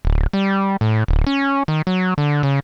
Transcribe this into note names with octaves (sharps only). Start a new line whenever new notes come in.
D1
G3
A2
D1
C#4
D#3
F#3
D3
C#3